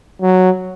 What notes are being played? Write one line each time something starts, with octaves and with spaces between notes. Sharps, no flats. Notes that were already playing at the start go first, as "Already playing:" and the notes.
F#3